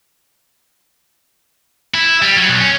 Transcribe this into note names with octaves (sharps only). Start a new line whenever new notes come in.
E4
G3
F#3
B1
C#4